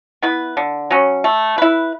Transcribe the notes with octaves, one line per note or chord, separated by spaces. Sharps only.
B3 E4 B4
D3
F#3 C#4
A3
E4 B4